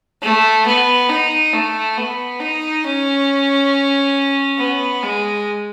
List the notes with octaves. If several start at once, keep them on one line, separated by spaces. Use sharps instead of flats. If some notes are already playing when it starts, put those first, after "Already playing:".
A3
B3
D#4
A3
B3
D#4
C#4
B3
G#3